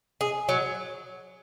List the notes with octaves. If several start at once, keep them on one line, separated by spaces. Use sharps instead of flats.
G#4
F#3